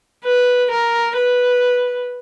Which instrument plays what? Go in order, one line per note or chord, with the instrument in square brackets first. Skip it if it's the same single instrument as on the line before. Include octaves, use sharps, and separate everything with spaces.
[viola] B4
A#4
B4